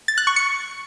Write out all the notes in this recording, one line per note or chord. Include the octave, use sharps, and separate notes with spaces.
A6
F#6
C#6
C#7